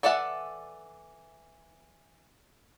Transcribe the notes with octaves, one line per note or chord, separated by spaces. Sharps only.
E3 A4 D5 E5 F#5